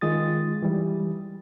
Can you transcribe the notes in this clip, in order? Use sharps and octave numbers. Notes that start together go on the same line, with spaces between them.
D#3 G#3 F4 D#6 A6
E3 G3